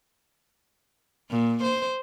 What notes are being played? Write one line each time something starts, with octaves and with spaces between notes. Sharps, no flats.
A#2
C5